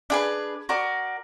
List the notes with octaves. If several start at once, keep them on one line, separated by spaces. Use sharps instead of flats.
D4 G#4 B4
F#4 A#4 D5